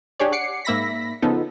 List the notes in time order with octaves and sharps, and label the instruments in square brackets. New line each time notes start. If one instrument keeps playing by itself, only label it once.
[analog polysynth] D4 G4 G#4 C#5 D5
F#5 D6 C7 C#7
G#2 A#3 E5 B5 A#6 B6
C#3 F3 B3 D#4 A4